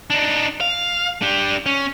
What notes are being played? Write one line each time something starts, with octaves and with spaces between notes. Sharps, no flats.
D4 D#4
F5
D4 G4
C#4